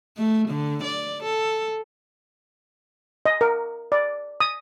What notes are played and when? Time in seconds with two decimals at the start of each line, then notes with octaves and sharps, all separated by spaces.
0.17 A3
0.48 D3
0.83 D5
1.23 A4
3.26 D#5
3.41 A#4
3.92 D5
4.40 D#6